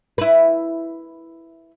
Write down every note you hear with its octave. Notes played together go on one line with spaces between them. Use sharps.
E4 B4